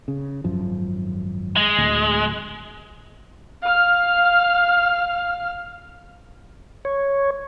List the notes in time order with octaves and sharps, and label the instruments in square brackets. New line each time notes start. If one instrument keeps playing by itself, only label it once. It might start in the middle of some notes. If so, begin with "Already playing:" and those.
[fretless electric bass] C#3
G#1 F#2 F3
[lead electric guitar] G#3
[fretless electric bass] D1 D2
[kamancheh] F5 F6
[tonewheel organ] C#5